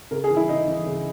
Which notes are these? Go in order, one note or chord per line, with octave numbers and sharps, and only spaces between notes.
C#3 A#4
G#4
E3
E4
C#3 D#4
E3
C#3